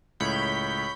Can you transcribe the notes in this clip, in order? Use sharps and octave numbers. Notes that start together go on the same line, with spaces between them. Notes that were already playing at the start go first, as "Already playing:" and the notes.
C#2 A2 C#5 B5 G6